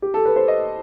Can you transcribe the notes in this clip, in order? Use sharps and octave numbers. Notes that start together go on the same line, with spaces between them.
G4
A4
B4
C5
D#5